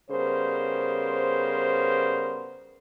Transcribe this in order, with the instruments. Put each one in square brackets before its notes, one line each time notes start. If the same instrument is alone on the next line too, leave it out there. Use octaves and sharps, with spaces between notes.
[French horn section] C#3 G3 B3 A#4 C5